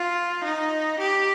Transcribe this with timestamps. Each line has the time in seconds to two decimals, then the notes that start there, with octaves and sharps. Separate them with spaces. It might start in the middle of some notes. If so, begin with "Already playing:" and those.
Already playing: F4
0.44 D#4
1.00 G4